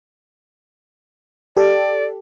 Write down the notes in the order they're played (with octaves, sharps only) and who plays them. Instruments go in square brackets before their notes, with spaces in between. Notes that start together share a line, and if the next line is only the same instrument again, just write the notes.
[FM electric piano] G4 A4 [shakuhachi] D5